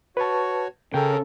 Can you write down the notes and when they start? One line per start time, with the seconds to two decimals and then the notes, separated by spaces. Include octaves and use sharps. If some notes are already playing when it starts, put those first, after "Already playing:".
0.17 F#4 B4 C#5 A5
0.94 C#3 A4 A#4 G5